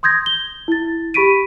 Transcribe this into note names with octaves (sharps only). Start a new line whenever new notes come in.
C6 D#6 G6 G#6 A#6
G7
E4 A6
G4 B5 C#6 B6 D7 D#7